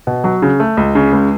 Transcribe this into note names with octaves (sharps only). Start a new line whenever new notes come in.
B2
F#3
C#3
A3
C#2
C#3
C#2